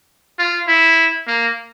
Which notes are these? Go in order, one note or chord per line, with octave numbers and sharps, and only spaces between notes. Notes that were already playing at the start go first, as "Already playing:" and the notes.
F4
E4
A#3